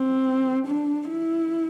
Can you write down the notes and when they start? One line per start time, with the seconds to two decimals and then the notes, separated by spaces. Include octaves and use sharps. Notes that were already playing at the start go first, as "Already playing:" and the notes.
Already playing: C4
0.67 D4
1.09 E4